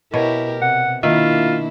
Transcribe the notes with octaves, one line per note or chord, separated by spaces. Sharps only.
B2 E4 G4 A#4 C#5
C3 F#5
D#3 A#3 D4 E4 F4 E5